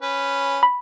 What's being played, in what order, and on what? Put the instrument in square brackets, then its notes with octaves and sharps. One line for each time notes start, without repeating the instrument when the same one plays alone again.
[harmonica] C#4 B4
[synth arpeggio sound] B5